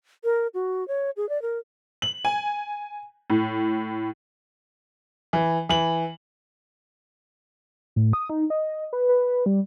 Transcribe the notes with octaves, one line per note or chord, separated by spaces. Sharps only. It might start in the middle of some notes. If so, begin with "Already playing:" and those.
A#4
F#4
C#5
G#4
D5
A#4
F#7
G#5
A2
E3
E3 F#7
A2
D#6
D#4
D#5
B4
B4
G3